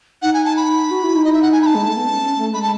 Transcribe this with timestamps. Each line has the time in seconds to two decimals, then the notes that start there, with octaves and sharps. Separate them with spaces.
0.22 D#4 F#5
0.34 G#5
0.45 A5
0.56 B5
0.91 F#4
1.04 E4
1.15 D#4
1.24 D#5
1.33 E5
1.42 F#5
1.52 G#5
1.62 B5
1.66 A5
1.75 G#3
1.86 A3
1.97 B3
2.08 C#4
2.23 C#4
2.38 A3
2.54 G#3 B5
2.62 A5